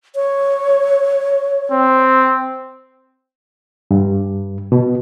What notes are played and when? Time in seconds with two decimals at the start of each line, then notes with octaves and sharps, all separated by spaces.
0.15 C#5
1.72 C4
3.91 G2
4.72 B2